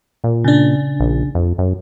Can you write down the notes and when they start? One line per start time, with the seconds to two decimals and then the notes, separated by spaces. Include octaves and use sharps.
0.24 A#2
0.44 C#3 D4
1.00 A#1
1.35 F2
1.58 F#2